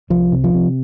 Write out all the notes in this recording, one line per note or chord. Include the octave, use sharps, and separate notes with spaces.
C2 F3
C3
F3
C3